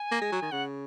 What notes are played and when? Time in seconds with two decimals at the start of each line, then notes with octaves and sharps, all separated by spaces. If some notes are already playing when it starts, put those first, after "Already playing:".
Already playing: G#5
0.11 A#3
0.21 G#3
0.32 F#3
0.42 D#3
0.52 C#3 F#5